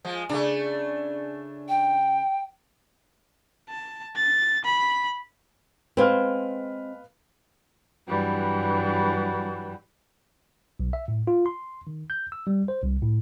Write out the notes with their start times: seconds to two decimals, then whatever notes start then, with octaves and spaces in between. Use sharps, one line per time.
0.05 F3 G#3
0.29 C#3 A3 D4
1.69 G5
3.69 A5
4.16 A6
4.65 B5
5.97 G#3 C4 B4 F5 F6
8.07 G2 E3 F#3 G3
10.80 B1
10.93 E5
11.08 A2
11.27 F4
11.46 C6
11.87 D#3
12.10 G6
12.32 E6
12.47 G3
12.68 C5
12.83 C2
13.02 A2